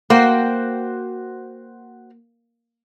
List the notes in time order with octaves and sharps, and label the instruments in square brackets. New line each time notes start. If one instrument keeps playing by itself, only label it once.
[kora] A#3 [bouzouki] F#4 C5 G5